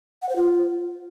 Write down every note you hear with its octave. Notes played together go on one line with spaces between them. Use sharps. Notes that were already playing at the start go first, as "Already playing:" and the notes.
F#5
C5
F4